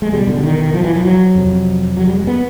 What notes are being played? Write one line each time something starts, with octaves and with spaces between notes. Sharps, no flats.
G#3
E2 B2 G3
D3
D#3
D#3
F3
E3
F3
F#3
F2 C3
F#3
G3
G#3
B3